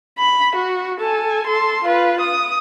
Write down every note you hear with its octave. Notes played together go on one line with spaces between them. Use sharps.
B5
F#4
A4 G#5
A4 C6
F4 B4
D#6